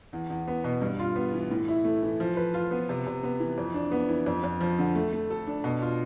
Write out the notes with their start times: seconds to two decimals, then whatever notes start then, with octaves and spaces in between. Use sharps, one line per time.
0.13 E2
0.30 E2
0.48 B3
0.64 B2
0.82 G2
0.99 F4
1.15 B3
1.33 E3
1.51 A2
1.68 E4
1.84 A3
2.03 E3
2.20 F3
2.37 B4
2.54 F4
2.71 B3
2.89 C3
3.06 C3
3.23 B3
3.40 E3
3.58 F2
3.74 D4
3.91 B3
4.09 E3
4.26 F2
4.44 F2
4.61 F3
4.79 D3
4.95 A3
5.13 A3
5.30 A4
5.47 D4
5.64 B2
5.82 F4